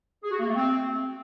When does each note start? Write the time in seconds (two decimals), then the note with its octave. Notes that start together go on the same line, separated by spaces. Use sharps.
0.23 G#4
0.31 F#4
0.39 A#3
0.48 A3
0.56 C4